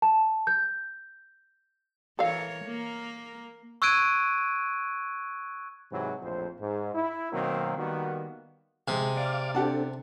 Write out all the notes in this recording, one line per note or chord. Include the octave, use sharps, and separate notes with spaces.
A5
G6
E3 A4 A#4 C#5 F5
A#3 A#4
C#6 E6 F#6 G#6 D7 D#7
G#2 C3 E3 F#3
A#1 F2 A2 C5
G#2
E4
B2 D#3 F#3 A#3 C4
D#3 G3 A#3 B3 F#4
C3 G#3
D5 F5 D6
C4 D4 G4 A4 F#5 A5